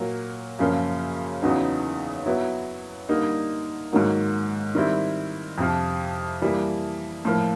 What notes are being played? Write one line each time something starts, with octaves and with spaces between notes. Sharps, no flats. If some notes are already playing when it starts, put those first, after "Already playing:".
Already playing: A#2 F#3 A#3
F#2 C#3 F3 A#3
E2 C#3 F#3 B3 D#4
F#3 B3 E4
D3 G3 A#3 D#4
G#2 D#3 F#3 A#3
D#3 G3 C4 E4
F2 C3 F3
E3 G3 A#3
A2 F3 A#3